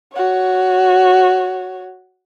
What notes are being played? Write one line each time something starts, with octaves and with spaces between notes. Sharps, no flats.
F#4 C#5